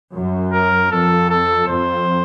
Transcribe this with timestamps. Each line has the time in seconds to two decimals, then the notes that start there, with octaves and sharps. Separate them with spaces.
0.13 F#2
0.52 A#4
0.90 F2 A4
1.30 A4
1.67 F2 C5